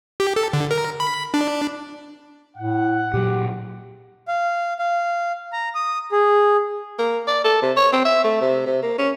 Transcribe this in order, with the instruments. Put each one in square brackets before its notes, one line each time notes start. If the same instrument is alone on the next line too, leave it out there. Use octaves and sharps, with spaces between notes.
[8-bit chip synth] G4
A4
D3
A#4
B5
D4
[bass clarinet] A2 [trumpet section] F#5
[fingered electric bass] A#2 F#3 [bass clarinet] G4
[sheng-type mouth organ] F5
F5
A#5
D#6
G#4
[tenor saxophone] A#3
D5
A4
C3
C#5
C4
E5
A3
C3
C3
A#3
C#4